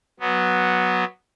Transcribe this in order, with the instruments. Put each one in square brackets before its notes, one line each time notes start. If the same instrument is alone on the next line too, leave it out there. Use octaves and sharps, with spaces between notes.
[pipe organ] F#3 B3